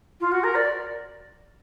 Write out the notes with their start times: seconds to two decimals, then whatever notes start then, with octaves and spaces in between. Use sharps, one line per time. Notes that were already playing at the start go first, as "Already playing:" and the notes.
0.20 F4
0.31 F#4
0.43 A#4
0.55 D5